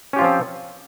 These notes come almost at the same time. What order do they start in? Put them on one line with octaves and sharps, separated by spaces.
C#4 G4 F4 F3 C4